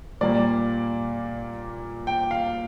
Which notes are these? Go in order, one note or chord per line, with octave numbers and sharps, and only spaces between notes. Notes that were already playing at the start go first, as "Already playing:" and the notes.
A#2 G3 A#3 D5
G5
F5